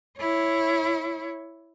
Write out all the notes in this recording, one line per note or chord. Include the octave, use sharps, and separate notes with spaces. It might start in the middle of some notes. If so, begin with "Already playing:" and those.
E4 C#5